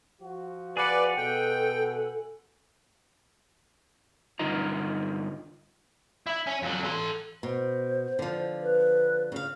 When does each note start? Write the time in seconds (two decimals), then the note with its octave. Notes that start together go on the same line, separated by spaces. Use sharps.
0.21 F3 F#4
0.77 G#4 B4 D5 F#5
1.17 B2 A4 G5
4.39 G2 D3 D#4 F4 D#5 A#5
6.27 E4 E5
6.47 C#4
6.62 F2 F#3
6.84 A4 C6
7.43 B2 C5
8.19 D3 F3
8.62 B4
9.32 C#3 F5